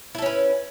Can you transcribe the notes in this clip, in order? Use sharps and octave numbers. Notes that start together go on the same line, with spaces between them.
C#4 E4 A4 B4